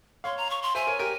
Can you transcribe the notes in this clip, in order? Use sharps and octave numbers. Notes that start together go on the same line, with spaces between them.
C#5 F5 C6
A#5
C#6
C6
C5 E5 G#5
A#4 C#5
G4 A#4